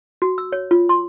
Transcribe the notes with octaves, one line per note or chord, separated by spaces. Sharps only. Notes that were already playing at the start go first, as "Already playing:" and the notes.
F#4
E6
C#5
F4
C6